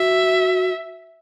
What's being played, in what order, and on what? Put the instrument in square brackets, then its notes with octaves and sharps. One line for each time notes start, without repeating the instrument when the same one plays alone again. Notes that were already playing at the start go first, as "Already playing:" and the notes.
Already playing: [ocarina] F#4 [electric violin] E5